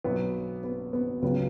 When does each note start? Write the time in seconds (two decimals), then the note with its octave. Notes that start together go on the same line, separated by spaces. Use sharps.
0.04 B1 B2 F#3 B3
0.63 B3
0.93 B3
1.22 C#2 C#3 F#3 B3